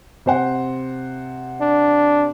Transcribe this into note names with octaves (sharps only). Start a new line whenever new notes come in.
C3 C5 F#5
D4